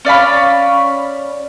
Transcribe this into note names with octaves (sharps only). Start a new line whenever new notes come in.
C#4 D5 F5 B5